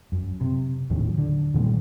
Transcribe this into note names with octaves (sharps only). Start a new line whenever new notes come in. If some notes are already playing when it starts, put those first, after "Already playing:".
F#2
C3
D#2 A2 D#3 F#3
D3
A#2 D#3 G3 A3